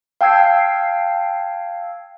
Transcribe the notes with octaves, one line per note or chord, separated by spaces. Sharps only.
F5 G5 A5 E6 G#6 C7